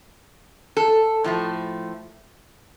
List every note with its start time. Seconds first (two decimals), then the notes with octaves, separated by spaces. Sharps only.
0.77 A4
1.24 A2 F3 A3